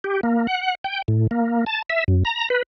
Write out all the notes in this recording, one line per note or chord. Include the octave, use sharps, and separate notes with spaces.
G4
A#3
F#5
G5
A2
A#3
A5
E5
F#2
A#5
B4